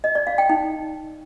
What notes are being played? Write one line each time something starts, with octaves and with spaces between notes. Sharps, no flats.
D#5
D5
F5
G5
D#4